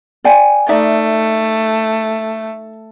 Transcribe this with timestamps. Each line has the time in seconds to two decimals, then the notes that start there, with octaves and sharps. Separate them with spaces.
0.24 D5 G5 G#5
0.69 A3 D#4 D5 E5